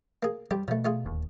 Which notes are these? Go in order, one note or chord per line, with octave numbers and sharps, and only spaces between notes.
A#3 G#4
F2 G3 G4
B2 F3 A3
A3 F4 G#4
D1 D#2